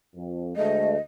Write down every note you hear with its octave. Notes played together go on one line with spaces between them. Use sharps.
F2
D2 G#3 A3 D#5